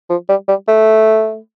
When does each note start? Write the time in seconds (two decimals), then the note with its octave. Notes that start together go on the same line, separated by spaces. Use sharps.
0.10 F3
0.29 G3
0.48 G3
0.68 A3